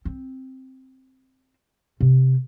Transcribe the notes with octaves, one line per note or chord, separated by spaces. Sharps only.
C4
C3